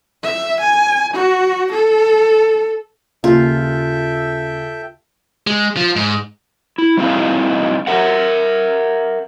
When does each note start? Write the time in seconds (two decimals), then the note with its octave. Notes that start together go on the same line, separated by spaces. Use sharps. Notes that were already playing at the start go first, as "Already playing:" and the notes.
0.24 E5
0.60 G#5
1.14 F#4
1.72 A4
3.24 D#2 C#3 F4 A4 E5 G5
5.47 G#3
5.77 F3
5.96 G#2
6.78 E4
6.97 G3 C4 D#4 E4 D#5 F5
7.87 A#4 E5 F#5